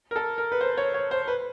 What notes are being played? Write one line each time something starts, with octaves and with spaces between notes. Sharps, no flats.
A#4
A4
A#4
B4
C5
C#5
C#5
C5
B4